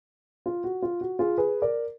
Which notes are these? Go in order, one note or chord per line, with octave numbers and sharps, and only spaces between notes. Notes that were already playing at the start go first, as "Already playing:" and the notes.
F4
F#4
F4
F#4
F4 G#4
G#4 B4
A#4 D5